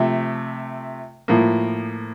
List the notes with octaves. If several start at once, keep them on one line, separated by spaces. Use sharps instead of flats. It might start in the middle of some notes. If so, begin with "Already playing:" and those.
Already playing: C3 F3 A3
A2 F3 A#3